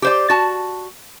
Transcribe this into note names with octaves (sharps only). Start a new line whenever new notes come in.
G4 C5 D5
F#4 A5